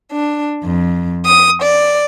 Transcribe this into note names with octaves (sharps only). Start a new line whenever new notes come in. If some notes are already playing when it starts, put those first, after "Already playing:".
D4
F2
D#6
D5